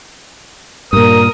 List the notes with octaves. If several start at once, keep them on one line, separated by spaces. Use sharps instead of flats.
G2 A#2 A#4 D#6